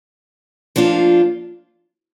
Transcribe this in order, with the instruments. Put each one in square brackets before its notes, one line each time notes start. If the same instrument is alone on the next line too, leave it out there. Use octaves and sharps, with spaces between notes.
[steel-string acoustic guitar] F3 A#3 D4 F4